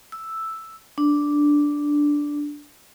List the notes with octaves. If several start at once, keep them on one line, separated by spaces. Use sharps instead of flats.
E6
D4